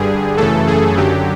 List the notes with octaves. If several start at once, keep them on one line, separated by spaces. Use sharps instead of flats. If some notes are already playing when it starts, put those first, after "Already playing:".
Already playing: G2 D3 G3 G#4
F#2 C#3 E3 A3 A4
G#4
F#2 D3 F#3 G4